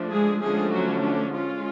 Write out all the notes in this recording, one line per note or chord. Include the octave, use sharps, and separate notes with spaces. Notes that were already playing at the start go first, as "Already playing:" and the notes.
Already playing: F3 A3 D4
G#3 G#4
D3 F3 G#3 A3 C#4 G#4
F#3 F#4
D4
G#3 C#4 F4